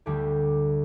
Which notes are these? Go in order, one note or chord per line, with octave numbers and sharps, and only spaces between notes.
D2 D3 G3 G4